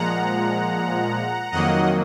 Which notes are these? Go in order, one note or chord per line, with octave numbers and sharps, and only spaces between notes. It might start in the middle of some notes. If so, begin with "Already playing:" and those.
Already playing: A#2 F3 G#3 F#5 A#5
F2 D#3 F#3 A#3 D#5 F#5